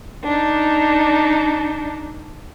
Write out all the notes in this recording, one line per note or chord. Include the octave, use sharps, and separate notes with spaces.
D4 D#4